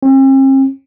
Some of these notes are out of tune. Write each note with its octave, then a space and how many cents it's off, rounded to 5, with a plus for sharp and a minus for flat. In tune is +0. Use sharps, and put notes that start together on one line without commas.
C4 +45